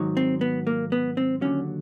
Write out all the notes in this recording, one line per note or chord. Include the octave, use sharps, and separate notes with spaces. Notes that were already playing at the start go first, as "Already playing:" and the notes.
Already playing: G#2 D#3 F#3
C4
B3
A#3
B3
C4
D#2 D3 F#3 C#4